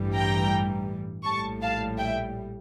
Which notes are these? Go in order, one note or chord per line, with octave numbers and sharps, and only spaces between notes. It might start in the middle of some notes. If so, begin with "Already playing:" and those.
Already playing: A1 G2 E3 G3
G5 A#5
A#1 A2 G3 A5 C#6
F5 A5
E5 G5